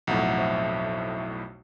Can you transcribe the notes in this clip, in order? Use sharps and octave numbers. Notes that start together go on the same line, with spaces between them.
B1 F2 A2 E5 F#5 A#5
C5 E5 A5